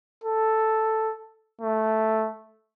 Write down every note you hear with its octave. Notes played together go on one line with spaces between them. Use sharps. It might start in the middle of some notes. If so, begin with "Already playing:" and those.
A4
A3